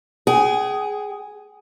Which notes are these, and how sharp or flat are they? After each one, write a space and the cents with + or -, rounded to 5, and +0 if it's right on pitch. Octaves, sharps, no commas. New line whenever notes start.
G#4 +0 G5 -45